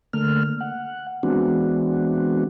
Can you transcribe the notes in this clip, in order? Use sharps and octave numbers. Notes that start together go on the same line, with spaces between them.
D3 A3 A#3 F6
F#5
E3 G#3 B3 C4 D4 F#4